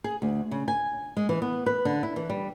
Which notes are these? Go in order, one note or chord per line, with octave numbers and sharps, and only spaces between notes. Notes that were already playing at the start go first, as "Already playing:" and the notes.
G#4
D2
C#3
G#5
G#3
E3
B3
B4
D3
E4
E3
G3